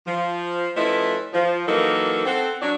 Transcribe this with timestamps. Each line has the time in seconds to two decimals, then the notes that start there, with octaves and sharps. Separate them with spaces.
0.07 F3
0.76 F3 A3 C#4 E4 B4 D#5
1.33 F3
1.67 E3 F#3 A#3 D#4 A4 A#4
2.25 C4 A4 F#5
2.62 F#3 D4